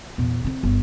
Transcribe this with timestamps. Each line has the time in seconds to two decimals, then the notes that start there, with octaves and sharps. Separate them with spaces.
0.18 E2 A#2
0.45 D3 C4
0.63 G1